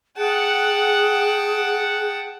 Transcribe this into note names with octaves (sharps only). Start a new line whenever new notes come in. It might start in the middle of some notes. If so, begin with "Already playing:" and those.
G#4 F#5 G5 A5